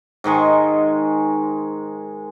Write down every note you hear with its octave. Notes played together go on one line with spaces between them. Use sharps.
G#2 D#3 G#3 C#6